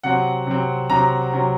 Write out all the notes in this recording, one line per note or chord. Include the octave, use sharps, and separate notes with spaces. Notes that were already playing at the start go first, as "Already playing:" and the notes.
C3 F#3 C4 F#5
C3 F#3 C4
C3 F#3 C4 A#5
C3 F#3 C4